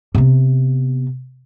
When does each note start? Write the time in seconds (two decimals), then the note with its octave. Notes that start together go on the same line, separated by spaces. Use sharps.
0.15 C3 B3